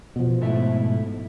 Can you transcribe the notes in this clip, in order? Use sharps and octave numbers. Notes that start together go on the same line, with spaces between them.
B2 F3
G#2 A3 E4